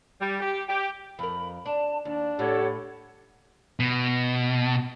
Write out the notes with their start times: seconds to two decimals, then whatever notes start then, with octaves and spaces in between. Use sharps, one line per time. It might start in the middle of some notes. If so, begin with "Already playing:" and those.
0.21 G3
0.41 G4
0.69 G4
1.19 F2 A#4 B5
1.65 D4 A5
2.05 D#2 D4 D5
2.39 A2 G4 A4 C#5 F#5
3.80 B2